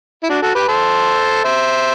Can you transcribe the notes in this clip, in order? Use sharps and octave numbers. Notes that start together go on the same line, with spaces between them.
E4
D4 F#4
F#4 A4
G4 B4
A4 C5
C5 E5